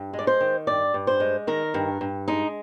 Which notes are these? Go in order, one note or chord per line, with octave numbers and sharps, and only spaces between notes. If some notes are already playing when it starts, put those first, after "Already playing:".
Already playing: G2
G#3
D5
C5
D#3
G2 D5
G2
C5
G#3
D#3 A#4
G2
G2
G#3 D#4